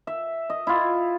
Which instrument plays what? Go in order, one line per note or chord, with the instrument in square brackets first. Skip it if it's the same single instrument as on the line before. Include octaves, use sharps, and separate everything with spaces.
[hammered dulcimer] E5
D#5
E4 F4